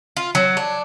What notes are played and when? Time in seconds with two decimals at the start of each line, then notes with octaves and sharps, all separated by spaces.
0.17 F4
0.35 F#3
0.57 D4